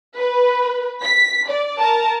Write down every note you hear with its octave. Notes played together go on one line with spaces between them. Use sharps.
B4
B6
D5
A#4 A5 A#5